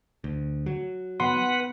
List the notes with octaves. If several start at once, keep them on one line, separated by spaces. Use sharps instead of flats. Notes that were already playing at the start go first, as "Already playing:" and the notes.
D2
F#3
B3 B4 F#5 C6